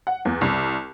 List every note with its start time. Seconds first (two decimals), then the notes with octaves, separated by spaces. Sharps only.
0.07 F#5
0.25 E2
0.41 C2